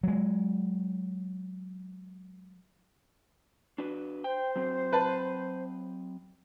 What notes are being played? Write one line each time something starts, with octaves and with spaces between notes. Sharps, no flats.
F#3 G#3
D4 F#4 B4
C5 G5
F#3 C4
B4 A5